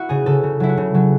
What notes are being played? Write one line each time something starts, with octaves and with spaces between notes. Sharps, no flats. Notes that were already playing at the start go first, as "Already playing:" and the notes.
Already playing: E4 F#4
C#3 G#4
C#3 A4
C#3
F#3 E4
F#4
C#3
F#3